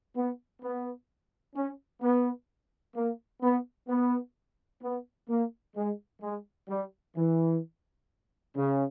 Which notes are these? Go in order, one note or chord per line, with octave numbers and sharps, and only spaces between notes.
B3
B3
C#4
B3
A#3
B3
B3
B3
A#3
G#3
G#3
G3
E3
C#3